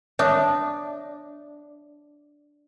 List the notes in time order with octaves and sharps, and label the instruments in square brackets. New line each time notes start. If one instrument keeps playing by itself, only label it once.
[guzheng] D4 [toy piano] C#5 E5 D#6